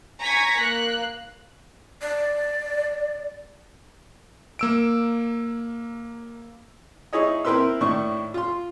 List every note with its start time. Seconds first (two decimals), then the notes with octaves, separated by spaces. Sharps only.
0.21 G#5 A#5 C#6 G#6 B6
0.59 A#3 F#6
2.02 D5
4.59 A#3 E6 D7
7.13 D#4 E4 G#4 C#5 D#5
7.45 C4 E4 A#4 B4 C6 E6
7.81 A2 D#3 D4 E4 C#6
8.34 F4 C6